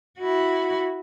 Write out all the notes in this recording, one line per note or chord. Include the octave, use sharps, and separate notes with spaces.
E4 F#4